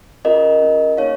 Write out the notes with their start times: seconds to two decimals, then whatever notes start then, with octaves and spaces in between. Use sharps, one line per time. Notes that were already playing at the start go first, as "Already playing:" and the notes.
0.25 C#4 F4 G#4 A#4 D#5
0.62 C#4 F4 G#4
0.97 A#3 D#4 G#4 C#5 F5